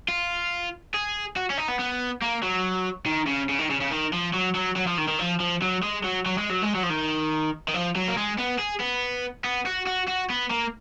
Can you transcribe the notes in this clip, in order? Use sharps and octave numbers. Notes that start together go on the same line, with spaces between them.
F4
G#4
F#4
C#4
D#4
B3
B3
A#3
F#3
D#3
C#3
C#3
D#3
C#3
C#3
D#3
F3
F#3
F#3
F#3
F3
D#3
D#3
F3
F3
F#3
G#3
F#3
F#3
G#3
F#3
G#3
F#3
F3
D#3
D#3
F3
F#3
A#3
G#3
B3
G#4
B3
B3
F#4
F#4
F#4
B3
A#3